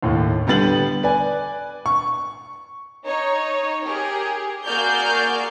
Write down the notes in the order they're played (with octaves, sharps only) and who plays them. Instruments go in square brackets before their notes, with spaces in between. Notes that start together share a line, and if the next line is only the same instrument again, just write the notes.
[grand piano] D#2 A2
D3 G3 B3 A6 F#7
B4 D5 G#5
C#6
[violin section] D#4 C#5
G4 G#4 A#4
A#3 F#4 G#4 D5 F6 G6